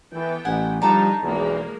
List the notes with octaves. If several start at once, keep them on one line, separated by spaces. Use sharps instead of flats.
E3 B3 A4 G5
A1 F#5 G#5
D3 F3 G3 D4 D#4 A4 A5 A#5
B1 E2 B2 F3 G#3 A#3